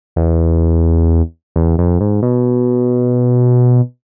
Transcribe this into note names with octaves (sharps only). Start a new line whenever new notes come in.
E2
E2
F2
G#2
B2